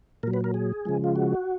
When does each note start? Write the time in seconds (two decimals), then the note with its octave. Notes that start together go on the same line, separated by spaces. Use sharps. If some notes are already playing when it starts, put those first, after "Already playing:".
0.23 A#2 A#4
0.27 F#3
0.34 B4
0.44 A#4
0.54 G#4
0.85 C#3 F3 G#3
1.04 F4
1.16 F#4